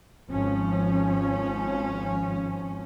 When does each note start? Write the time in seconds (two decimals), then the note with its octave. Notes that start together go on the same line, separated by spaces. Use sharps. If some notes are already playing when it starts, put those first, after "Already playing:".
0.30 G#1 F3 C#4